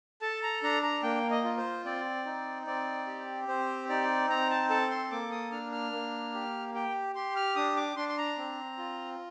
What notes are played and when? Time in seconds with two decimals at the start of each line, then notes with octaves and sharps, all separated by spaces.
0.21 A4 A5
0.43 A#5
0.63 D4 A#5
0.83 A#5
1.03 A#3 G5
1.31 D#5
1.44 F4
1.57 C5
1.85 C4 D5
2.26 D#4
2.67 C4 D5
3.07 G4
3.48 C4 C5
3.89 D#4 D5
4.29 C4 A#5
4.50 A5
4.70 A4 A5
4.90 C6
5.11 A#3 D6
5.31 D#6
5.52 D4 F6
5.72 F6
5.92 A#3
6.34 G4
6.75 G4 G5
7.15 G4 C6
7.36 F6
7.56 D4 D#6
7.76 D6
7.96 D4 C6
8.09 C6
8.18 A#5
8.38 C4
8.78 F4